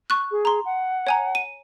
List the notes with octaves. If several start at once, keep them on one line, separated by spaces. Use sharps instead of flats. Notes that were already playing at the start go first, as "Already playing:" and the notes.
C#6 F#6
G#4
A#5 C6
F#5
C#5 G#5 A#5
D#7